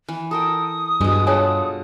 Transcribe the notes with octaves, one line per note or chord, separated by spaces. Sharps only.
E3
A4 A#4 G5 D#6
G2 B2 G#3
D4 F4 G#4 A4 C#5 G#5